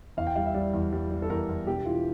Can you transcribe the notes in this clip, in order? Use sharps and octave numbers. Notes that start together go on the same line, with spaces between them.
E2 F5
G5
G3 F5
E5
G3 D5
E2
G3
G3
A4
E2 A#4
E2
E1 G4
E3 F4